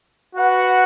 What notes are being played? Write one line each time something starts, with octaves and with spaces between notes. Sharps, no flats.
F#4 B4 F#5